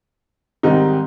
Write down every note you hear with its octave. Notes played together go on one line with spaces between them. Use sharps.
G#2 D#3 G3 C4 D#4